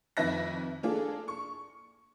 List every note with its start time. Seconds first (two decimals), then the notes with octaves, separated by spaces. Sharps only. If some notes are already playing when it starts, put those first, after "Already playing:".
0.17 F2 D#3 B4 E5 F#6 A#6
0.83 A#3 D4 F4 G#4 A4
1.28 C#6